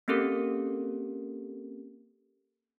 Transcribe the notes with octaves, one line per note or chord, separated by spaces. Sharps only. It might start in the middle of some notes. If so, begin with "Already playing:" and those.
A#3 C4 C#4 G4 A4 A#4